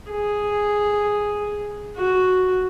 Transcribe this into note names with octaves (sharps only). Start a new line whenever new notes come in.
G#4
F#4